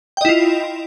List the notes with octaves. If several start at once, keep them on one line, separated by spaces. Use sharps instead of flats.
E4 F4 D#5 G5